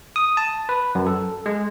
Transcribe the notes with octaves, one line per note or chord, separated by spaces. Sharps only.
D#6
A5
B4
F#2
A4
G#3